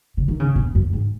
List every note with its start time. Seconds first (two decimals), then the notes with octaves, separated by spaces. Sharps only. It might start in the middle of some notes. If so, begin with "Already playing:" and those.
0.17 C#3
0.28 D#3
0.40 C#3
0.55 B2
0.75 F#2
0.93 G#2